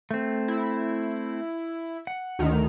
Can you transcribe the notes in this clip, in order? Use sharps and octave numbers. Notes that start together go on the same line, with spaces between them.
A3 C4
E4
F#5
D2 D#3 F6